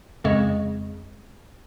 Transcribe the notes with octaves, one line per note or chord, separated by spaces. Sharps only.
F2 C#3 G#3